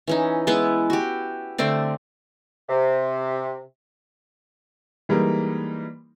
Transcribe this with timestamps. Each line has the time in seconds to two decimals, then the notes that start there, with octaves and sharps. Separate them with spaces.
0.08 E3 C#4 D#4
0.47 G#3 B3 E4 B4
0.90 F#4 G4
1.58 D3 A3 C4 D5
2.69 C3
5.09 E3 G3 G#3 A#3 D#4